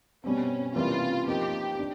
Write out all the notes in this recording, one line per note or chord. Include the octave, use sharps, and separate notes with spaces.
B2 G3 C4 C#4
C3 E3 G3 A#3 C#4 F4
F3 A#3 D#4 G4
D4